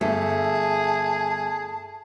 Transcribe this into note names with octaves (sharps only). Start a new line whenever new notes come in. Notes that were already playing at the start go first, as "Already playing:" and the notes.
G1 A3 G#4 A5